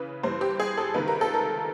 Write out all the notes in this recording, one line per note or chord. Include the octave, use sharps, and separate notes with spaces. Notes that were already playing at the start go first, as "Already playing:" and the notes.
Already playing: C#3 E3 B4
G2 E3 C5
G4
G#4
A4
C#2 C3 D#3 B4
A#4
A4
A#4